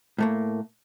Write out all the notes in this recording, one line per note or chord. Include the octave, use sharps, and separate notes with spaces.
A2 A3 A#3